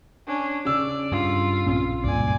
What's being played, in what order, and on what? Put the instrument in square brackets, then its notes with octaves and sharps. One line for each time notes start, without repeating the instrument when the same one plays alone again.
[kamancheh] C#4 D4
[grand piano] C#3 E6 [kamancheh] D5
[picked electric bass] G2 [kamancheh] F4
[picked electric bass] A#1 C4 C#4
[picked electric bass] C#2 G2 A#2 [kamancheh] D5 G#5